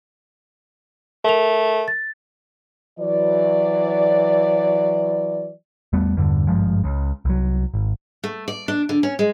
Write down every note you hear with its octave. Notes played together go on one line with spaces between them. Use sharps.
A3 A#4 F7
A6
E3 F#3 D5
E2 G3 A3 B3
E2 G2 D3
G#1 G2 F3 G#3
C#2 C#3
C2 F#3
G#1
A3
D5
D4
D3
C#4
G#3